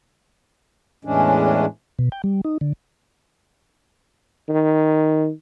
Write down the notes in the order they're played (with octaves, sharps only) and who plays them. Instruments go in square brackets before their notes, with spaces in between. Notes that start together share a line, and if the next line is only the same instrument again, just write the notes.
[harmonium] E2 A2 E3 G#3 C#4 D4
[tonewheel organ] B2
G5
G3
D#4
D3
[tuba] D#3